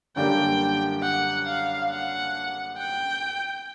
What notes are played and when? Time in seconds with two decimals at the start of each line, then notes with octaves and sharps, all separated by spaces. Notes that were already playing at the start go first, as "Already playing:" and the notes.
0.16 F#2 D3 G3 A#3 D4 G5
1.02 F#5
1.47 F5
1.90 F#5
2.77 G5